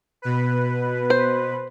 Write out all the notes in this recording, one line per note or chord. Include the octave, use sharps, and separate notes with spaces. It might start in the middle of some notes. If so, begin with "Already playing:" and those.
B2 B4
C5